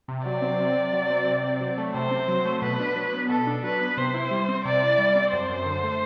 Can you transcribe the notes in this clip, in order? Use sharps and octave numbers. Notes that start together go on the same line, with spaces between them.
C3
F#3 D5
C4
C3
C3
F#3
C4
C3
C4
F#3
A3
C3 C5
C4
F#3
A3
B2 B4
D4
F#3
B3
B2 A4
D4
F#3 B4
B3
C3 C5
E4
G3
C4
C3 D5
E4
G3
C4
F#2 C5
F#2
D3
A3